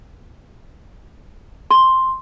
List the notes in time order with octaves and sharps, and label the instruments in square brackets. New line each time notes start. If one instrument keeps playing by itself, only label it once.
[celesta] C6